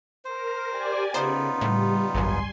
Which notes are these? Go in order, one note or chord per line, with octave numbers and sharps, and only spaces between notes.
A#4 C5
G4 D5 G#5
C#3 B3 D#4 F4 C5
A2 G3
G#1 C#2 F#2 G#5 C6